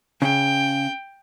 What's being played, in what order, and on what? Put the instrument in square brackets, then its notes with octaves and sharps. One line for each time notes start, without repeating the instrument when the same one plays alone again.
[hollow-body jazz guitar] C#3 [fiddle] G5